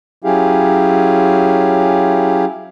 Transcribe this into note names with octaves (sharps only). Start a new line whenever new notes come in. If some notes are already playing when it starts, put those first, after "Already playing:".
F#3 C#4 E4 G4 G#4 F5